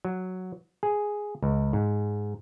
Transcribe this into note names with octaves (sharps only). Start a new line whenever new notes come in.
F#3
G#4
C#2
G#2